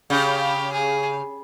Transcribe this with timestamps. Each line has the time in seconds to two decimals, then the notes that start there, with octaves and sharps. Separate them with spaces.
0.10 C#3 G4
0.72 G#4